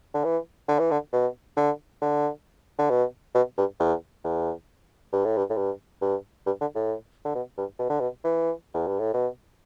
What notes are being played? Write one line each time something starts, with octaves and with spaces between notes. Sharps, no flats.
D3
E3
D3
E3
D3
B2
D3
D3
D3
B2
B2
G2
E2
E2
G2
A2
G2
A2
G2
G2
G2
D3
A2
D3
B2
G2
B2
D3
B2
E3
E2
G2
A2
B2